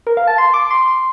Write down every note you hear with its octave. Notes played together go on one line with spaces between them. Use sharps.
A#4
F5
A5
C6
D6
C6